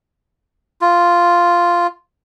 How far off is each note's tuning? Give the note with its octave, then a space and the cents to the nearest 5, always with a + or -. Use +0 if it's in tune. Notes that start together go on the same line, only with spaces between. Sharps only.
F4 -5